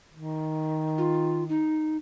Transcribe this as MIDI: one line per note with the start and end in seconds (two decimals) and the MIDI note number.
0.14 1.65 51
0.98 1.44 65
1.49 1.97 63